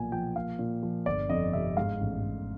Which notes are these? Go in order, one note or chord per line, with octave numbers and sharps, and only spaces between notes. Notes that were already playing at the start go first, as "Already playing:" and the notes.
Already playing: B1 A#2 F3 G#5
F3 G5
A#2 F5
A#2
F3
G1 D5
F2 D#5
C3 E5
G#2 F5
A1
A1